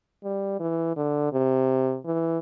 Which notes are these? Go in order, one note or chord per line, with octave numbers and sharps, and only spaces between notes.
G3
E3
D3
C3
E3